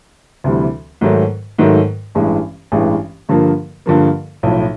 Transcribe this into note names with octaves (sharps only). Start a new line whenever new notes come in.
D2 C3 E3 G3
G#2 D#3 F#3 A3
G#2 D#3 F#3 A3
A1 G2 E3 G#3
A1 G2 E3 G#3
G2 D3 F3 A#3
G2 D3 F3 A#3
B1 A2 F3